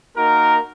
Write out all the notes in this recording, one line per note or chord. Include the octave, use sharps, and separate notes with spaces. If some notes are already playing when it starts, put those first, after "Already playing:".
A#3 D#4 F#4 A#4